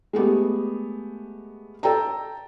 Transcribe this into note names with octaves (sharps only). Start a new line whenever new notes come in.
G#3 A3 B3 G4
A4 G5 A#5